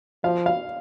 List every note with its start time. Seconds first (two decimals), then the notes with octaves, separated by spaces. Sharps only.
0.24 F3 F5
0.46 F5